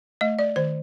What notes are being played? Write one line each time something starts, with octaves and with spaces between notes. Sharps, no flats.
A3 D#5
D5
D#3 C5